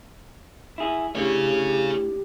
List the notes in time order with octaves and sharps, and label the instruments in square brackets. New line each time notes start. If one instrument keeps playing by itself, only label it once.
[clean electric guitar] E4 G#4
[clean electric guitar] A2 D3 [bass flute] G4 [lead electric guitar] G#4 C#5